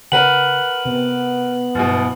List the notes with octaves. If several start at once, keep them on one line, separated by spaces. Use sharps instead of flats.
C#3 A#4 B4 F#5 F#7
C3 B3
F#1 G2 B2